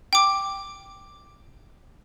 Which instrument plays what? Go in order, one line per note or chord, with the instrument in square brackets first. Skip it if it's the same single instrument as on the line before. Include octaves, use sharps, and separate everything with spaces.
[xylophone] G5 D6